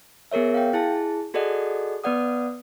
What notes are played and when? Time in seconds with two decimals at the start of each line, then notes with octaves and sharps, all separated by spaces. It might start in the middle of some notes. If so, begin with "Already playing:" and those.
0.31 B3 G#4 A#4 C#5 E5
0.54 F5 G5
0.73 E4 G#4 A5
1.34 F#4 G#4 A4 D5 D#5 F#5
2.04 B3 B4 D5 F#5 D#6